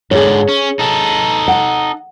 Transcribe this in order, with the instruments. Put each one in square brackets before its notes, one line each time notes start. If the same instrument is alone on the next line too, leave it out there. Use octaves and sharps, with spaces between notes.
[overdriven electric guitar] G#2 D3 [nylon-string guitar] G#4 C#5
[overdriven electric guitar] C#4
D#4 A4
[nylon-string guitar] F#5